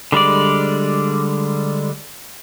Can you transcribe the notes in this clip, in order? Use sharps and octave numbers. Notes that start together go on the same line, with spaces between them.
D3 G3 G#3 D5